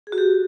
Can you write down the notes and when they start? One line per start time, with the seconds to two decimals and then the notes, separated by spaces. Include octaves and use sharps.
0.07 G#4
0.12 F#4
0.18 G4